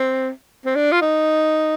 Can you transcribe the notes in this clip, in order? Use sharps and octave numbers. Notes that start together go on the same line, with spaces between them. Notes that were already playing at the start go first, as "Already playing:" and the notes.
Already playing: C4
C4
D4
F4
D#4